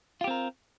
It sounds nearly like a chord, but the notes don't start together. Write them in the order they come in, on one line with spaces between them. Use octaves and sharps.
F4 G4 C4 A#4